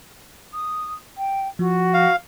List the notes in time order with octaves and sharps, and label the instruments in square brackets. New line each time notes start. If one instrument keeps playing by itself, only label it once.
[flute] D#6
G5
[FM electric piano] F3 [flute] F#4
[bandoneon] F5